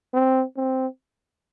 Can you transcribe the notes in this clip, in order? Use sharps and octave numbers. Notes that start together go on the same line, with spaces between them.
C4
C4